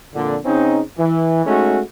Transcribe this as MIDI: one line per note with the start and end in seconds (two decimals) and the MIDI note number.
0.14 0.36 41
0.14 0.36 46
0.14 0.36 50
0.45 0.80 49
0.45 0.80 60
0.45 0.80 61
0.45 0.80 63
0.98 1.44 52
1.45 1.80 56
1.45 1.80 57
1.45 1.80 61
1.45 1.80 63
1.45 1.80 66